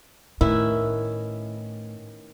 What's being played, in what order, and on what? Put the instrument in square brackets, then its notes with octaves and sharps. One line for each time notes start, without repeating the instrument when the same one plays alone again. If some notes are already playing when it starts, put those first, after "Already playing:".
[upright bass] A2 [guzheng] D#3 B3 C#4 [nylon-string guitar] E4